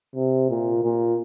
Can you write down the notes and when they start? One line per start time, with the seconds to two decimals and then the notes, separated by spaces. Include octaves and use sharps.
0.16 C3
0.50 A#2
0.84 A#2